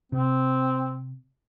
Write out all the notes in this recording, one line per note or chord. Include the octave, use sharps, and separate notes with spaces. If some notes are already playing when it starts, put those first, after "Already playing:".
C3 C4